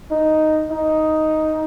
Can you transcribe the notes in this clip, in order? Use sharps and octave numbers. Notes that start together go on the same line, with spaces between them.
D#4
D#4